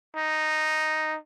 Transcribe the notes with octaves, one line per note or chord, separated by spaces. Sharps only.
D#4